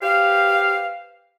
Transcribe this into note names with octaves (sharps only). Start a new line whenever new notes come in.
G4 B4 C5 F5